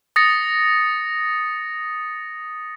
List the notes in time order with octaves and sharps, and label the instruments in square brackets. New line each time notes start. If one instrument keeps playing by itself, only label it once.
[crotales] D#6 A6 A#6 C#7